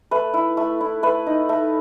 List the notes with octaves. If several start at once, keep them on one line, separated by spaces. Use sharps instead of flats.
A3 B4
E4
A3
E4
A3 B4
D#4
A3